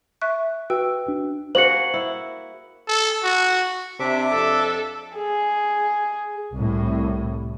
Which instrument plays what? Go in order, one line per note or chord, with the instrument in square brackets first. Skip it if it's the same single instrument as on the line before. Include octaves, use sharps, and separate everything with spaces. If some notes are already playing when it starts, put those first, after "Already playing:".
[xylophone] E5 C#6 F#6
[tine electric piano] F#4 [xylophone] B4 G5 E6
[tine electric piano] D4
[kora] A#3 F#4 G#4 [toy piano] C5 [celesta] C#7 F#7
[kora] E4
[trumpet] A4
F#4
[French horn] C3 [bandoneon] D4 E5 D6
[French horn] F2 [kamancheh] A4
[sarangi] G#4
[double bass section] C2 A2